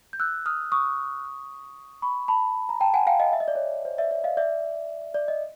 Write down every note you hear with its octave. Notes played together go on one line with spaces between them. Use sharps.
G6
E6 F#6
D#6 F6
C#6 D#6
B5 C#6
A5 B5
A#5
G5 A5
F#5 G#5
F5 G5
D#5 F5
E5
D#5
D5
C#5 D#5
C5 D5
D5 E5
D5 E5
D#5 F5
D5 E5
D5
D#5